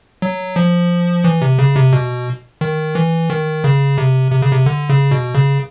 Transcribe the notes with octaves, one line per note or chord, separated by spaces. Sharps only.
F#3
F3
E3
C3
C#3
C3
B2
D#3
E3
D#3
C#3
C3
C3
C#3
C3
D3
C#3
B2
C#3